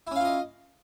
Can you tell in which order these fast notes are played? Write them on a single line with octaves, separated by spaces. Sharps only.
E4 C#4 F5 F4 D#5